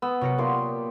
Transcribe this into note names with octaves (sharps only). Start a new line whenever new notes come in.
B3 E6
C3 F#3 F#4 A#4 C#7
A#2 G4 C6